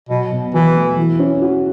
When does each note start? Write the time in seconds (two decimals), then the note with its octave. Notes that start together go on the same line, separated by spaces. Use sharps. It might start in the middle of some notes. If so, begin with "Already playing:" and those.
0.09 B2 F#3
0.32 B2
0.53 E3 F#4
0.75 A3
0.97 E3
1.19 C#4
1.41 F#4